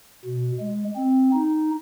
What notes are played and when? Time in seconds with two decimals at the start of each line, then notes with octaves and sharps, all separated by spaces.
0.25 B2
0.60 G#3
0.96 C4
1.33 D#4